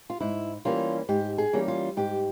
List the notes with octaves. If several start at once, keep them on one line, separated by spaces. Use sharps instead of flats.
F4
G#2 E4
E3 G3 A#3 C#4 F4
G#2 G4
G#4
E3 G3 A#3 C#4
F4
G#2 G4